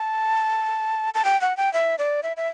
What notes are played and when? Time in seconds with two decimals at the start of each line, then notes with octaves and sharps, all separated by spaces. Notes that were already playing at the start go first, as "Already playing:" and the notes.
Already playing: A5
1.14 A5
1.25 G5
1.41 F#5
1.57 G5
1.73 E5
1.99 D5
2.23 E5
2.37 E5